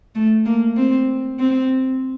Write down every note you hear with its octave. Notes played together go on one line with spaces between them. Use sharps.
A3
A#3
C4
C4